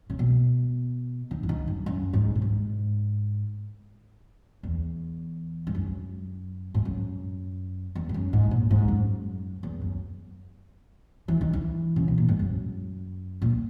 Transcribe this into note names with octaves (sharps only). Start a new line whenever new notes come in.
C#3
B2
D#3
E3
D#3
F#2
F#2
G#2
A#2
G#2
E2
G#2
F#2
G#2
F#2
E2
G#2
F#2
G#2
A#2
G#2
F#2
E2
F#2
E3
D#3
E3
C#3
B2
A#2
G#2
F#2
A#2